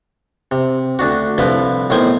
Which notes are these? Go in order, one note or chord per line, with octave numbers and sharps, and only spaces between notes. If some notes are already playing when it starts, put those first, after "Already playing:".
C3
D2 D4 F#4
C2 D3 F3 E4 B4
B1 A2 D#3 C5 G#5